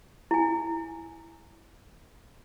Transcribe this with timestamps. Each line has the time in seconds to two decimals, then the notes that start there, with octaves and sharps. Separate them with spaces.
0.31 E4 G#5